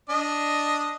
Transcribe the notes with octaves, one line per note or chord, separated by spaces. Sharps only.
D4 D#5